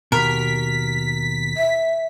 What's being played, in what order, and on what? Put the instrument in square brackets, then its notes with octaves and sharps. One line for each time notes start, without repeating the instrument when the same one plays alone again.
[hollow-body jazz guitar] D#2 B2 [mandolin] A#4 [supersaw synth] B6
[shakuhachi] E5